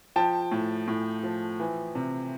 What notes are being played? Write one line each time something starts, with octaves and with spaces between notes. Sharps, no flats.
F3 G5 A5
A2
A2
F3
E3
C3